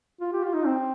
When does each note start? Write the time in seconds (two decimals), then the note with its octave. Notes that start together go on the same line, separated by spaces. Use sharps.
0.21 F4
0.33 G4
0.43 F4
0.54 D#4
0.66 C4